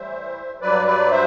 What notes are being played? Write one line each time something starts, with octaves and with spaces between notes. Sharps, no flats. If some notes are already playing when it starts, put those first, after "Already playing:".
Already playing: A2 E3 G3 C5 E5
G2 F#3 B4 D5
B4 D5
C5 E5